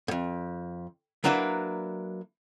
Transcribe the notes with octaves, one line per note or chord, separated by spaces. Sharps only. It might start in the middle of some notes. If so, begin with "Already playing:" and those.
F2 G#2
F#3 A#3 D4 E4 B4